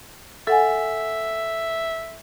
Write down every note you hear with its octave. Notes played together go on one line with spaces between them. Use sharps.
A4 E5 F#5 G#5